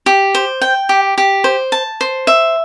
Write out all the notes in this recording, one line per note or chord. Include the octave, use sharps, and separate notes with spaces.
G4
C5
G5
G4
G4
C5
A5
C5
E5